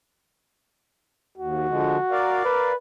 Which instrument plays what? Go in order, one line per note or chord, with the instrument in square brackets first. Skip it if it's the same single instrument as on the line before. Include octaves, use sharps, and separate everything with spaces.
[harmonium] D#2 [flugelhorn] F#4
[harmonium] D3 F3 G#3
A#4 D5 F5
[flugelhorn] B4